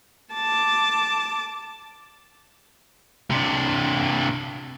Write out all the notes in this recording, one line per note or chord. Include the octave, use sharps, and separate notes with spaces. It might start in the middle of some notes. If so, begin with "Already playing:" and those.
A5 D6
C3 D4